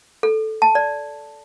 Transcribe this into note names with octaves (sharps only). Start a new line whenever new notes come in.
A4
A5
D5